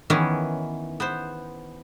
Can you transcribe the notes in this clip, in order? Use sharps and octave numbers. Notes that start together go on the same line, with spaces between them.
D#3 E3 B3 C#4
B3 C5